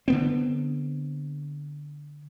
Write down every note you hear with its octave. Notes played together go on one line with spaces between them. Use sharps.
D3 B3 C4